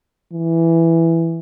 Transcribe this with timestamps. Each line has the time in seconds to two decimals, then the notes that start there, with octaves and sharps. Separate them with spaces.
0.32 E3